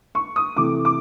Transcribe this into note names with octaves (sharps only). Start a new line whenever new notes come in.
C#6
D#6
C3 E3 A3 D6
D6